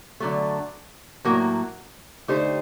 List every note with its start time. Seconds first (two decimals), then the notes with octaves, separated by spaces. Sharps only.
0.20 D3 F#3 A3
1.25 A2 F#3 A#3 F#4
2.28 D3 A3 D#4 G4 C5